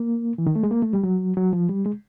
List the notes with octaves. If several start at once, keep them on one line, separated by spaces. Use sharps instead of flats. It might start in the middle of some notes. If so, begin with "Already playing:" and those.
Already playing: A#3
E3
D#3
A3
G#3
A#3
A3
G3
F#3
F#3
F3
G3
G#3